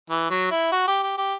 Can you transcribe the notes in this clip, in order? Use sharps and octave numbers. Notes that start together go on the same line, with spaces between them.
E3
F#3
E4
F#4
G4
G4
G4